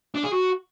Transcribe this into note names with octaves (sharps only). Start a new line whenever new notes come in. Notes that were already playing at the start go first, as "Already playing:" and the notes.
D4
G#4
F#4